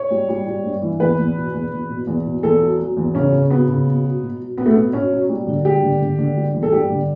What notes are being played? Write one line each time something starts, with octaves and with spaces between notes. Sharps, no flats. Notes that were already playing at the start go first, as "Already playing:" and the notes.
Already playing: C#5
G3
G3
G3
G2
E3
E2 B4
E2
B2
E2
E2
B2
E2
B2
E2 A4
F#3
F#3
E2
C#3 C#4
C#3
F#3 B3
C#3
B2
F#3
B2
F#3
F#3 B3
A3
B2 B3
B2 C#4
F#3
G3
D3
G3 G4
D3
D3
D3
G3
E2
A4
G2 G4
D3